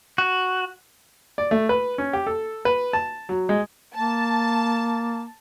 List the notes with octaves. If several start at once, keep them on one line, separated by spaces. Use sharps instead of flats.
F#4
D5
A3
B4
C#4
G4
A4
B4
A5
F#3
G#3
A#3 A5